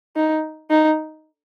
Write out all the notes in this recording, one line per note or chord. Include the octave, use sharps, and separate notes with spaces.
D#4
D#4